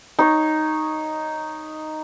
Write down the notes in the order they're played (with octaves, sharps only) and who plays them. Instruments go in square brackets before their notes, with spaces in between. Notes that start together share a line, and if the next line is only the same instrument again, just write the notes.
[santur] D#4 C#5